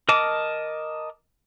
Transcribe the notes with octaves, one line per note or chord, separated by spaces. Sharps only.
A#4 D#5 A5 D6